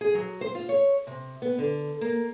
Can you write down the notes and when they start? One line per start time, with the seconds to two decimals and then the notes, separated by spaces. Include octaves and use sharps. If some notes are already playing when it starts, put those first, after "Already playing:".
0.01 G#4
0.15 F#3
0.41 C5
0.55 F4
0.69 C#5
1.07 C3
1.42 B3
1.58 D3
2.01 A#3